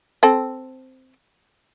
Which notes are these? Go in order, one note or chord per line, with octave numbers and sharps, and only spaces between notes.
C4 A4